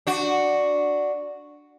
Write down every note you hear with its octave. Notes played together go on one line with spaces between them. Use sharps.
D4 F#4